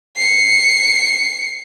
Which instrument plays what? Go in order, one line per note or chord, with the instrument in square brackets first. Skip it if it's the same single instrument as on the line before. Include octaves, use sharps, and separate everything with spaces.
[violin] C7 C#7